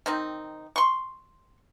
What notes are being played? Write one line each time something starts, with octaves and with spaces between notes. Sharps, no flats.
D#3 C4 D#4
C6 C#6